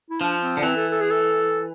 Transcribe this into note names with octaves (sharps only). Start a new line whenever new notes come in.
E4
F3 D4
C4
D3
E3 C4
A4
A4
G#4
A4